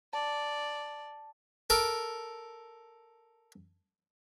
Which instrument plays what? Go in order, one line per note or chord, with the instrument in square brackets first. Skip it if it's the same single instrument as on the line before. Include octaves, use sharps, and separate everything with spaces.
[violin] D5 [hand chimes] A5
[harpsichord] A4 A#4 D6